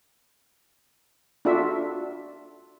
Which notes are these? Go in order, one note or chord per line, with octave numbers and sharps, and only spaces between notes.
D4 F4 F#4 A4 E5